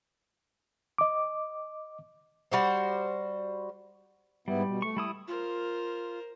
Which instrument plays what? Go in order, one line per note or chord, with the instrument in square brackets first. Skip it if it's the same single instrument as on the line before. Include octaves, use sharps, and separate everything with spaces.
[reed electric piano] D#5 D6
[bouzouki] G3 F#4 C5
[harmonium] G#2 B3 E4 [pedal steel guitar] G3
[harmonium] B2
[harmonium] A3 [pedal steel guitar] C#6
[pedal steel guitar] G3 E4 D#6
[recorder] F4 [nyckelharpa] A#4 C5